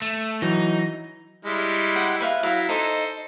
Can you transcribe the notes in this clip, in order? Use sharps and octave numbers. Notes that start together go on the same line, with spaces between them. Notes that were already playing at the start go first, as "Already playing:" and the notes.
A3
E3 F#3 D#4
G3 G#3 E4
F#5 G5
B4 E5 F5
F#3 E4 F5
D#4 A4 C5 D#5